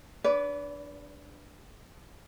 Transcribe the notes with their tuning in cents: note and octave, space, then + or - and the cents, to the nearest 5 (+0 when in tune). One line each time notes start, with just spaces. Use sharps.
D4 +0 B4 +0 D5 -40